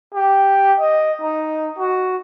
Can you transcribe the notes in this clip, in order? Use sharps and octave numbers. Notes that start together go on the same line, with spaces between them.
G4
D#5
D#4
F#4